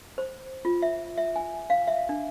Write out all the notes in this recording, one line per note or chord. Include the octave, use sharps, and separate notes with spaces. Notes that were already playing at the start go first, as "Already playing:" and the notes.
C5
F4
E5
E5
G#5
F5
E5
D4